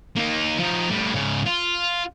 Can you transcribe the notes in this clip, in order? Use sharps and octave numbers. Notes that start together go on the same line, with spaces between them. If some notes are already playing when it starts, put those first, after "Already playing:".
A#3 D#4
F3 D#4
A2 G3
G#2 C#3
F4